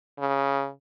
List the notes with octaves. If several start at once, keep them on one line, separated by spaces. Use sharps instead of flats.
C#3